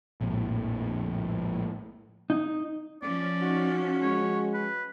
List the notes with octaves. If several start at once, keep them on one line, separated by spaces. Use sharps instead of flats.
A#1 F2 A2
D#4
F3 C#4 D5
D#4 F#4
G#3 C#5
B4